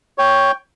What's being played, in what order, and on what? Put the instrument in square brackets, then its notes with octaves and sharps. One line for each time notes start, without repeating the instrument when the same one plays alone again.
[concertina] C#5 G5